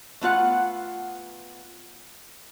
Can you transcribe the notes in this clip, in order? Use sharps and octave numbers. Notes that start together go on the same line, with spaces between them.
A3 B3 F4 F#5